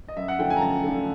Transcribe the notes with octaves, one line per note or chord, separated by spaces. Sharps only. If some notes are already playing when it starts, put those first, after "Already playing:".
D#5
F#2 E5
F#5
D3 F3 A3 G5
G#5
A#5
F#2 A5
D3 F3 A3